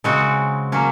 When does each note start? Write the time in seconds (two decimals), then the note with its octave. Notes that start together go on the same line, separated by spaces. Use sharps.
0.04 C#3 G#3 C4 F#4
0.72 F#3 A#3 C#4